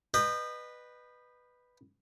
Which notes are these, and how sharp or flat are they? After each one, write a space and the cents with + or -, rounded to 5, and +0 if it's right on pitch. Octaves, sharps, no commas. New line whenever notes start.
B4 +0 D#5 -30 G5 +0